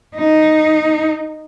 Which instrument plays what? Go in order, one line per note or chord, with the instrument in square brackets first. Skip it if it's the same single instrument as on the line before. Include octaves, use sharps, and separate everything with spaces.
[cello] D#4